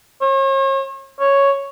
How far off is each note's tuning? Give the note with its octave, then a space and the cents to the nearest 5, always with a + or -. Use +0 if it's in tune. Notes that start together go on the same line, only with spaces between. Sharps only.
C#5 -40
C#5 +0